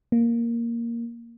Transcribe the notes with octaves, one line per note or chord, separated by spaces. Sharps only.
A#3